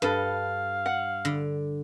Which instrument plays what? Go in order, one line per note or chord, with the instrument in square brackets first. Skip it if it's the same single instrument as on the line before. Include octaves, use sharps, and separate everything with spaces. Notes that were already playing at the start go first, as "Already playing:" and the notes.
[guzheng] G2 [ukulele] A4 B4 [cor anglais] F5
[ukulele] F#5
[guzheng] D3